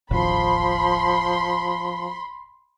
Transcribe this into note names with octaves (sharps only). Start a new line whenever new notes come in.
E1 A1 D#2 F3 B5 C6